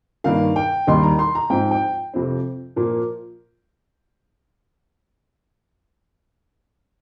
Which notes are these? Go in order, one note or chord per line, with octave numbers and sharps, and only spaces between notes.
G2 D#3 A#3 F5
G5
D#2 D#3 G3 A#3 D#4 C6
A#5
C6
A#5
G#2 F3 C4 G5
G5
F2 C3 F3 C4
A#2 F3 A#3